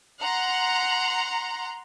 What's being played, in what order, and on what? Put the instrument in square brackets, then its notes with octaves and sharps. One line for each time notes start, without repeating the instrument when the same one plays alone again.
[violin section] F#5 A#5 C6